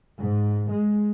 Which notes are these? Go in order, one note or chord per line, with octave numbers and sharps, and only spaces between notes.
G#2
G#3